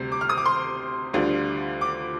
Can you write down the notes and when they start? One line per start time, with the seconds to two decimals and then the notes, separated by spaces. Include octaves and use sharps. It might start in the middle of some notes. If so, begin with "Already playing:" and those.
Already playing: D2 C3 G3
0.12 D6
0.21 F6
0.29 D#6
0.38 D6
0.45 C6
1.13 D2 D3 G3 D4 F4
1.81 D6